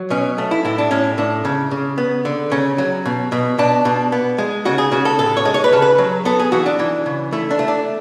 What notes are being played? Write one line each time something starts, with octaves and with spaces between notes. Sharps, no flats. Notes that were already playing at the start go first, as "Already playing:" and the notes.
Already playing: F#3
B2 C#4
A3
E4
A2 E4
D4
A2 C#4
A2 D4
C#3
C#3
B3
D3
C#3 C#4
F#3
B2
B2
B2 D4
B2
B3
G#3
C#3 F#4
G#4
C#3 F#4
A4
A2 A4
C#5
G#3
C#5
B4
C#3 A4
B4
F#3
B3 A4
G#4
E3 F#4
D4
E3
C#3
A3 E4
D4
A3
D4